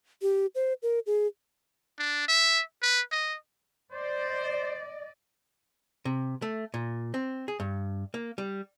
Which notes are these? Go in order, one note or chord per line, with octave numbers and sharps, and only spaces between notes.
G4
C5
A#4
G#4
D4
E5
B4
D#5
C5 D5 D#5
C3
A3
A#2
C4
G#4
G2
A#3
G3